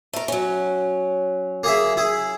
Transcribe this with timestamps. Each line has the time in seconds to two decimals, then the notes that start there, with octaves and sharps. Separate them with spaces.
0.13 A3 A#4
0.28 F#3 C#4
1.63 A#3 G#4 E5
1.97 E4 G#4